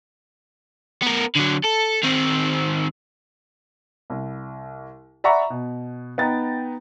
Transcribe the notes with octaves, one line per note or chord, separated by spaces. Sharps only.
B3 A#4
D3 F#3
A4
D#3 C4
C2
D5 E5 F#5 A#5 B5 C#6
B2
B3 D#4 G5 A#5 A6